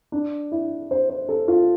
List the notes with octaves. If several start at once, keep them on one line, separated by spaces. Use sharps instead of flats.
D4
E4
C5
C5
A4
F4